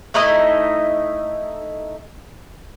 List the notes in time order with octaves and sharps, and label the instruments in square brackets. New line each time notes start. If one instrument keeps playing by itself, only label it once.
[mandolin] A3 D#4 E4 D#5